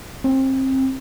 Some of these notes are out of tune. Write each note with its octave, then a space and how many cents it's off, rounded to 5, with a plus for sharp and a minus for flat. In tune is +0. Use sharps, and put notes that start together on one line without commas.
C4 +25